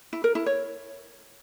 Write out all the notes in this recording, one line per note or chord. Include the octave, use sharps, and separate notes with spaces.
E4
A#4
E4
C#5